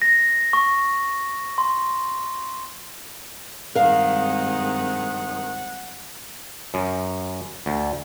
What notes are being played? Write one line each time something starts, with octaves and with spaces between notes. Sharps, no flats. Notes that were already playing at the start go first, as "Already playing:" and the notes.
A#6
C#6
C6
G2 D#3 G#3 C4 A#4 F5 F#5
F#2
D2